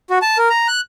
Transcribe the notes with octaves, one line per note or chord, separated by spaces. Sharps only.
F#4
A5
A#4
A#5
F#6